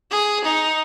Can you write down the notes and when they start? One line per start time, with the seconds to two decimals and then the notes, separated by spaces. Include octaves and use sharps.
0.11 G#4
0.45 D#4